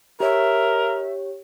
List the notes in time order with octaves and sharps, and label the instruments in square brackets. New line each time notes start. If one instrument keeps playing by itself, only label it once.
[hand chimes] G4 C#5 [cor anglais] A#4 [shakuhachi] E5